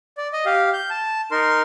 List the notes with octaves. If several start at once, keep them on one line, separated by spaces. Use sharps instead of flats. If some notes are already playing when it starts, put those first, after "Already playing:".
D5
D#5
G4 F5
G6
A5
D#4 A#4 C6